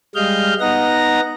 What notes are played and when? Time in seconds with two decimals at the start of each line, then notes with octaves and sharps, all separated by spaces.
0.15 G3 G#3 D#5 F5 F6 G6
0.60 B3 D#4 D#5 F#5 A#5 A#6